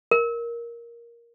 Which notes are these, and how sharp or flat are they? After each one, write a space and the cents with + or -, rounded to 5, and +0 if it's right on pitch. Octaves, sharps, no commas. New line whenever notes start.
A#4 +10